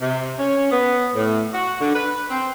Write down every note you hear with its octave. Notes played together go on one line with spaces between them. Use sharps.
C3
C#4
B3
A2
F#4
D3
B4
C4